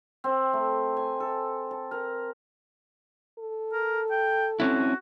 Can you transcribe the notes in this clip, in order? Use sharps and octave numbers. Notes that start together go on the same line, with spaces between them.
C4
A3
G#5
A4
A5
A#4
A4
A#4
G5
C4 C#4 E4 F#4